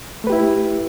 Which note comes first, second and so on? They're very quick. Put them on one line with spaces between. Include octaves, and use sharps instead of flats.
A3 B4 G4 E4